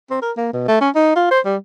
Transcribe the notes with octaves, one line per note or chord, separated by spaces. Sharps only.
C4
A#4
A#3
B2
A3
C#4
D#4
F4
C5
G3